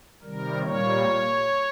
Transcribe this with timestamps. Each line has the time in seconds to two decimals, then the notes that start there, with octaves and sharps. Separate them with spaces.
0.22 C3 D#3 G3 A#4
0.63 A#2 G3 A#3 C#5